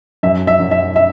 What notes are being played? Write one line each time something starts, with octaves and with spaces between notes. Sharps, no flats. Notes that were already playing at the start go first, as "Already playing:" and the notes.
F#2 E5
E5
F#2
E5
E5